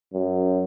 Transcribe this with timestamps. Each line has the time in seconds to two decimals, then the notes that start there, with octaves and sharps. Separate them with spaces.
0.14 F#2